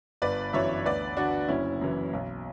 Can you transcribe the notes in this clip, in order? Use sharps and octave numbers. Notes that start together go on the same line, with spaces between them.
G1 B4 D5
F#2 E3 C#5 E5
D2 B4 D5
D3 D4 F#4
F#1 C#4 E4
F#2 E3
B1